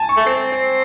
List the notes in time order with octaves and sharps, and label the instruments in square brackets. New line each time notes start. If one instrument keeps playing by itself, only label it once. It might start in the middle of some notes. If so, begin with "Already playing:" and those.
Already playing: [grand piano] G#5 A5
C#6
[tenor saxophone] A3
C4
C4